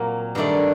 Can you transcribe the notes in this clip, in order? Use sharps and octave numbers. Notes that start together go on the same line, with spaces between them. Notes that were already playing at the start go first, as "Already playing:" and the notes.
Already playing: A#2 F#3 A#3 C4
G2 D#3 A3 D4 D5